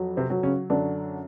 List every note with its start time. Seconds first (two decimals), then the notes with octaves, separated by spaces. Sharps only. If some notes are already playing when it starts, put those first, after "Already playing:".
Already playing: F2 F#3
0.17 C3 C4
0.30 F#3
0.43 C#3 C#4
0.70 F#2 D3 D4